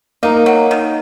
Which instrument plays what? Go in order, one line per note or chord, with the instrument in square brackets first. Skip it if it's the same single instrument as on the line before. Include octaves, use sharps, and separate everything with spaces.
[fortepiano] A#3 [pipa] D#4
[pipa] F#3
D#3